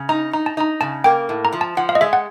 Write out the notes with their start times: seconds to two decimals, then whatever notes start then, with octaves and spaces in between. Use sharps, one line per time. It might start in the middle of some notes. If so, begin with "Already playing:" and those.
Already playing: C#3
0.09 D#4 A#5
0.33 D#4 A#5
0.46 A5
0.57 D#4 A#5
0.81 C#3 A5
1.04 A#3 G5
1.29 A2
1.45 A#5
1.53 F3
1.61 A5
1.77 F3 F#5
1.89 F5
1.95 D#5
2.01 G#3 E5
2.13 F#5